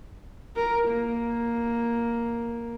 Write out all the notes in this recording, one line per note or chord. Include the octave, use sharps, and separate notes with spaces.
A#4
A#3